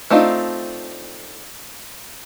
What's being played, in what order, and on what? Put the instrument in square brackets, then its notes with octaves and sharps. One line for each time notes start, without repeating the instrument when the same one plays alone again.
[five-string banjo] A3 C4 D4 D#4 F4